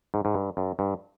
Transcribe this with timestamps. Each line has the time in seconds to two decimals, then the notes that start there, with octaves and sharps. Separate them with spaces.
0.14 G#2
0.25 G#2
0.35 G2
0.57 F#2
0.79 G2